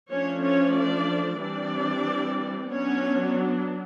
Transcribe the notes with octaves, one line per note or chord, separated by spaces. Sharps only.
F3 A3 C#4 D4 C#5
C#4 C#5
D4 D5
E3 G3 C4 D4 D5
F#3 B3 C#4 D4 C#5